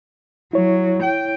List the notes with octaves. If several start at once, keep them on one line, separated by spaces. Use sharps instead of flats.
F#3 E4 C#5
G5